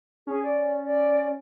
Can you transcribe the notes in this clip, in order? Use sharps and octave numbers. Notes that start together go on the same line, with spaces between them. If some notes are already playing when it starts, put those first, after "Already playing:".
C#4 G#4
D5
D5